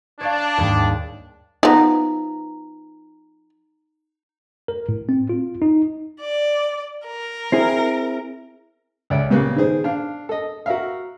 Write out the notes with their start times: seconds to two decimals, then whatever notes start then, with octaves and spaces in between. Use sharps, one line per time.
0.21 D4 C#5 D5 F5
0.58 D#2 G#2 G3
1.63 F3 B3 D#4 A#5
4.68 A#4
4.89 A2
5.09 C4
5.29 F4
5.62 D#4
6.21 D5
7.06 A#4
7.52 C4 E4 G#4
9.10 C#2 D5 E5
9.30 A#2 C#3 G3 A#3 B3 B4
9.56 D#3 B3 G#4 C5
9.84 D4 F5
10.29 A4 D#5
10.66 F#4 A#4 E5 F5